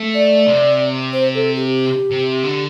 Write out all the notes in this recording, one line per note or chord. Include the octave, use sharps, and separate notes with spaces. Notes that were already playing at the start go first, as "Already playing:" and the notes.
Already playing: A3
D5
C3
C5
A4
G4
C3
D3